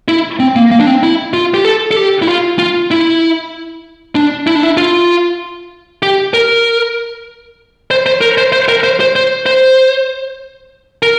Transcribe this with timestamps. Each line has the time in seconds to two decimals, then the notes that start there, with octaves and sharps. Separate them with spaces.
0.08 E4
0.40 C4
0.56 A#3
0.71 A#3
0.80 D4
0.87 C4
1.03 E4
1.33 F4
1.54 G4
1.65 A4
1.91 A4
1.96 G4
2.22 E4
2.27 F4
2.58 F4
2.91 E4
4.15 D4
4.47 E4
4.55 D4
4.63 E4
4.77 F4
6.03 G4
6.34 A#4
7.91 C5
8.06 C5
8.21 A#4
8.38 C5
8.53 C5
8.69 A#4
8.84 C5
9.00 C5
9.16 C5
9.46 C5
11.03 A#4